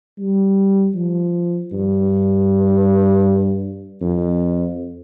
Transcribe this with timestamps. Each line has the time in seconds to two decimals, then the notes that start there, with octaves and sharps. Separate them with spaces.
0.19 G3
0.96 F3
1.73 G2
4.01 F2